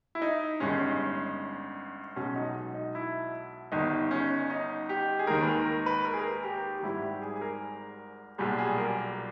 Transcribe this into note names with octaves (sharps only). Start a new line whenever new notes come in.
E4
D#4
G1 G2 D#3 G#3 C#4
B1 B2 G#3 C#4
D#4
D#4
E4
G1 G2 D#3 D#4
C#4
D#4
G4
G#4
D#2 D#3 G#3 A#4
B4
A#4
A#4
B4
A#4
G#4
A#4
G4
G4
G#1 G#2 G3 E4
G4
G#4
G#4
A#4
B1 A#2 G3 G#4
G#4
A#4